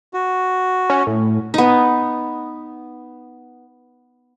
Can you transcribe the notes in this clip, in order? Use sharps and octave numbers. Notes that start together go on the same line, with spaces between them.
F#4
C#4
A2
B3 D#4